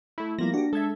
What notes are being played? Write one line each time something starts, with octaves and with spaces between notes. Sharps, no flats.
A3 E4
F3 G3 A#3 B3 E4 A#6
D4 F#4 G4
G#3 A4 E5 G#6